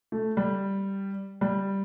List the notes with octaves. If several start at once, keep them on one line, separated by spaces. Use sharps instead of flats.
A3
G3
G3